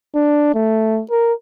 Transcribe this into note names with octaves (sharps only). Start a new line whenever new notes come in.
D4
A3
A#4